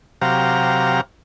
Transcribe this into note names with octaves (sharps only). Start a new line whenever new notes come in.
C3 F#3 G4 F5 A#5